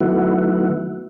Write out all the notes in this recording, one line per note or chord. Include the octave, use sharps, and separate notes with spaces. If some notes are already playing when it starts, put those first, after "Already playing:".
D#3 F#3 A3 B3 E4 F#4